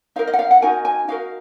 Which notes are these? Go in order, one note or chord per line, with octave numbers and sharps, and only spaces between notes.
D#4 A#4 F5
D#5
F#5
F5
F#5
D#4 F#4 A#4 G#5
G#5
D#4 F#4 A#4 F5